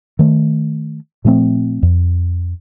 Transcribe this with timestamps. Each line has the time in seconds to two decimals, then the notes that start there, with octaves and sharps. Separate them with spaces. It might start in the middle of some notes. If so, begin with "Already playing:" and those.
0.19 D#3 A3
1.25 A#2 F3 A3 C4
1.83 F2